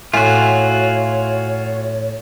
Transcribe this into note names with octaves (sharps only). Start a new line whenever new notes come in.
A2 F4 F#4 C#5 E5 G#5